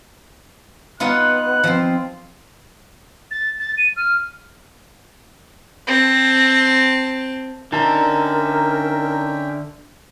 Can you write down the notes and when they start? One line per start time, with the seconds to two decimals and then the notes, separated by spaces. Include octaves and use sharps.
1.00 B3 D#4 F4 F#6
1.64 F3 C4
3.31 A6
3.60 A6
3.78 D#7
3.96 F6
5.87 C4 A5
7.73 D3 C#4 D#4 A#4 E5 G5 A5